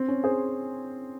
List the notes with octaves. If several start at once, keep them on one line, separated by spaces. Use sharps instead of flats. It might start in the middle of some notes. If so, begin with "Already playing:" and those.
Already playing: C4
C#4
G#4 C5